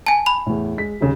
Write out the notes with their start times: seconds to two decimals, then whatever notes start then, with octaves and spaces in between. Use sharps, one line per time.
0.07 G#5 A5
0.26 B5 F7
0.46 E2 A2
0.77 G#3 B6
1.00 D#1 D#2 C#3